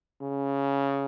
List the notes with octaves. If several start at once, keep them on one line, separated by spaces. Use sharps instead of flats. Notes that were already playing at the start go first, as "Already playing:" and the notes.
C#3